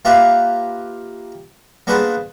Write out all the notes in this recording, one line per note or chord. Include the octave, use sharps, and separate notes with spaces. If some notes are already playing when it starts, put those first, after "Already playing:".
A#3 F4 G4 B4 E5
A#3 B3 D4 G#4 B4 C5